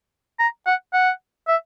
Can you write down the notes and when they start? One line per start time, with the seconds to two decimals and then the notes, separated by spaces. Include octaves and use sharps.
0.39 A#5
0.66 F#5
0.93 F#5
1.48 E5